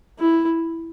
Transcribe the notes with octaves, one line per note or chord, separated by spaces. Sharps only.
E4